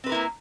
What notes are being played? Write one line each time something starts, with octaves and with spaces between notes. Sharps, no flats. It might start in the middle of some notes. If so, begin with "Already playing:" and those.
A#3 C4 E4 A#4 B4